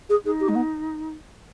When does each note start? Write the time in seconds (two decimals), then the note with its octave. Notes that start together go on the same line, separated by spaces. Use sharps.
0.09 G#4
0.24 D#4 G#4
0.40 G4
0.48 G#3
0.55 B3